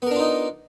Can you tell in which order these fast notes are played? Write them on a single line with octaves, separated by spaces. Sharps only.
B3 A#4 D4 F4 D#4